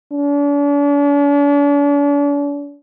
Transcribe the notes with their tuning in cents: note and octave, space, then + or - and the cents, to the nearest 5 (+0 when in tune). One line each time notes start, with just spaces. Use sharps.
D4 -45